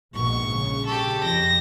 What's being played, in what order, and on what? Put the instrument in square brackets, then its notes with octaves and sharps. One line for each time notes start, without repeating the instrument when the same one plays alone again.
[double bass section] A#1 G#2 B2 [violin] C#6
[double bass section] C#3
[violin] G4 A4
[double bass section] F2 [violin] A#6